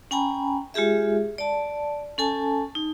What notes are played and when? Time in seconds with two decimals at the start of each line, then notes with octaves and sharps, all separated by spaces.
0.11 C#4 G5 G#5 A#5 B5
0.74 G#3 F4 G4 G#4 E5
1.38 D5 A5
2.18 C#4 A4 G#5 A5
2.75 D#4